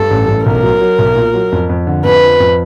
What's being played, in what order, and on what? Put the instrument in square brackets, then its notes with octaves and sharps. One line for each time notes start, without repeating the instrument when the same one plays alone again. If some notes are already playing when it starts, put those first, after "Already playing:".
Already playing: [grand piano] G2 [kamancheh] A4
[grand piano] A1
A1
[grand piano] B1 [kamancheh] A#4
[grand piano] F#3
F#3
B1
A#2
F#3
F2
F2
D3
[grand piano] F2 [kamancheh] B4
[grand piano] F3
F2